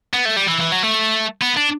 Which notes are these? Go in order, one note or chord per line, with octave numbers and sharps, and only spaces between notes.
B3
A3
G3
E3
E3
F#3
A3
B3
D4